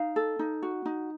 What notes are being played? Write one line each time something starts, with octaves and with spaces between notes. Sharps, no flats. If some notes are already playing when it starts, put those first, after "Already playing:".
Already playing: D#4 F5
A4
D#4
F#4
D#4